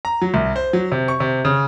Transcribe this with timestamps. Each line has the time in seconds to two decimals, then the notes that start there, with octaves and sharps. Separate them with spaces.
0.05 A#5
0.22 F#3
0.34 C2
0.56 C5
0.73 F#3
0.92 C3
1.08 C#6
1.20 C3
1.45 C#3